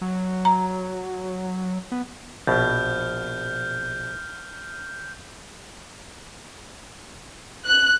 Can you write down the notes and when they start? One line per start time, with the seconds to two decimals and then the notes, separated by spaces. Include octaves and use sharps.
0.01 F#3
0.45 A#5
1.92 B3
2.47 A#1 B2 F6 G6
7.66 F#6